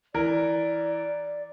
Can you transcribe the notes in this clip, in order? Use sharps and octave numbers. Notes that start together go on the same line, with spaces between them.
E3 A#4 D5